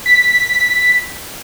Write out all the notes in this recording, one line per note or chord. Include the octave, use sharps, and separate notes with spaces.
B6